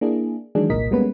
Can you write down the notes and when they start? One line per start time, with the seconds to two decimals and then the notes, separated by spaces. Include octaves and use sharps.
0.01 A#3 D4 E4 G#4
0.55 D#3 E3 F#3 G#3 D4 G#4
0.70 G1 C2 A#2 A#4 D#5 B6
0.91 G3 G#3 A#3 B3 C#4 B4